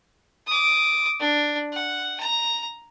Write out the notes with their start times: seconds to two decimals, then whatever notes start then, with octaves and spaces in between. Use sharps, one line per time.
0.47 D6 D#6
1.20 D4
1.73 F#5
2.20 A#5